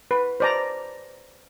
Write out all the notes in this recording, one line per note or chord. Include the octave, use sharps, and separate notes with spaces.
B4
C5 D5 A#5